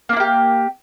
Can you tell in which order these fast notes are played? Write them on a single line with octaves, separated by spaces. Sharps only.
A#3 D4 E4 G4